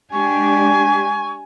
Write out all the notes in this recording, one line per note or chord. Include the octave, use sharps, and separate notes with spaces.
G#3 D4 G4 G#5 C#6